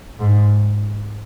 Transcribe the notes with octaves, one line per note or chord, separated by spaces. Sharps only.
G#2